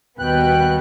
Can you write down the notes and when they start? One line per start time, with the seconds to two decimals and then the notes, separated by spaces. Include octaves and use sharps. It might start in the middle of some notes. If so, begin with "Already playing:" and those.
0.19 D#2 B2 G3 B3 G5 F#6